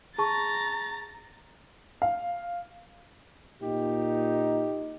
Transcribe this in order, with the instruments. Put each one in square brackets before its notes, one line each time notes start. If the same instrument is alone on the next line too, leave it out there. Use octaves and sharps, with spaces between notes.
[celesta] G#4 A5 C#6 [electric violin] A#5 A6
[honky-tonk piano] F5
[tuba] A#2 [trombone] D#4 [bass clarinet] G4